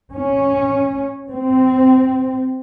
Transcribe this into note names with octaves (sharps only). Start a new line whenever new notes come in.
C#4
C4